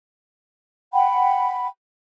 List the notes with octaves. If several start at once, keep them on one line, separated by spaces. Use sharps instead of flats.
F#5 G5 B5